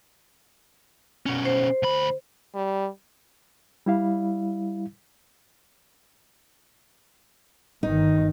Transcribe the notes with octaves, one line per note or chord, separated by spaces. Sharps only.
B2 C#4
C5
D2 B5
G3
G3 E4 F5
G1 D#3 D#4